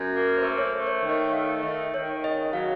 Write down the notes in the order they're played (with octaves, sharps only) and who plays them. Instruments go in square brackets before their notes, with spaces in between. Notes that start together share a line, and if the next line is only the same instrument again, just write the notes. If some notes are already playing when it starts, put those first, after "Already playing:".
Already playing: [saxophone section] F#2
A#3
[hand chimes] C5
[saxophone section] A3 [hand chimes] A#4
[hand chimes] C#5
C5
[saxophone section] A3
[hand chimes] C#5
[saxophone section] D#3
[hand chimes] D#5
[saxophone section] A3 [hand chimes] F5
[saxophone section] D#3 [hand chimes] D#5
[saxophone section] D#3 [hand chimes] C#5
[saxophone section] C#3 [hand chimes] D#5
[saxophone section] F#3 [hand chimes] F5